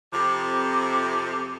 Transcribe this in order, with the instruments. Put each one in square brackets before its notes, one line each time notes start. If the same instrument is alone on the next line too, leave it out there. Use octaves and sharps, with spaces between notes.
[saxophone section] F2 C3 [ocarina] D6